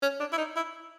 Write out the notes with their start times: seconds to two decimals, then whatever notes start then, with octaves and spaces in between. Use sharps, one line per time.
0.02 C#4
0.20 D4
0.33 E4
0.38 D#4
0.56 E4